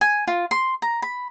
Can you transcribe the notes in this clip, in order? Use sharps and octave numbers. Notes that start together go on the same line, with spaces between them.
G#5
F4
C6
A#5
B5